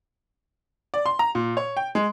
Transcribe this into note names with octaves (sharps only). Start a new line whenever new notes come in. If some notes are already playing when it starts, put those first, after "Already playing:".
D5
C6
A#5
A#2
C#5
G5
G#3